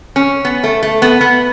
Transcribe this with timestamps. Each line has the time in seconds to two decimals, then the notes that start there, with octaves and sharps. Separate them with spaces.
0.16 C#4
0.45 B3
0.64 A3
0.83 A3
1.02 B3
1.21 B3